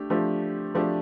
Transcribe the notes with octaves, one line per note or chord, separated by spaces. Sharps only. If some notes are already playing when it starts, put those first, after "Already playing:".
Already playing: A3 D4 G4
F3 A3 D4 G4
F3 A3 D4 G4